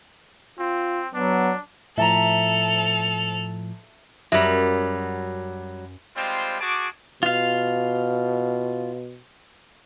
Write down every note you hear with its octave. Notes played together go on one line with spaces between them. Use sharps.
C4 F4
F#3 B3 D4
A2 F3 A4 E5 A5 A#5 F7
F#2 F#3 G3 C#4 A#4 E5
G3 G#3 C4 F4 C5
F#4 G#4 A5 D6
B2 F4 F5